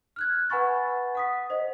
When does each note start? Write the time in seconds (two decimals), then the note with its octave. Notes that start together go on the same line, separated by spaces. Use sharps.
0.16 F6 F#6 G#6
0.50 B4 F#5 G#5 B5 C#6 A6
1.15 F#5 D#6 B6
1.50 C5 D#5